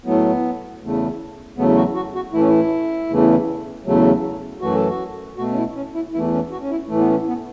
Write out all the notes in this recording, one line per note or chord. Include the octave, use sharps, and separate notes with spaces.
A2 F#3 A3 B3
E2 C#3 A3
E2 C#3 F#3 A3 B3
F#4
F#4
F#4
A2 E3 A3 E4
C#4
E4
E2 C#3 E3 A3
E2 C#3 F#3 A3
F#2 E3 A3 F#4
A4
F#4
B2 A3 F#4
C#4
E4
C#4
E4
E2 E3 A3 E4
C#4
F#4
C#4
E4
A2 E3 A3
B3
C#4
B3